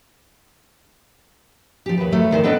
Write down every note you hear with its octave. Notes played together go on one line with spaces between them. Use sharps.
F3 G4
D#2 B4
F#2 F#3 A3
E2 D#3 G#4 C5
B3 D4 A4 B4 D#5 G5